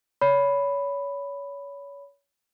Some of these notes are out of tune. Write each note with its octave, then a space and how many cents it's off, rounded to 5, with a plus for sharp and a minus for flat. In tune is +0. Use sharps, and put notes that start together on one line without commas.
C#5 +30 B5 +0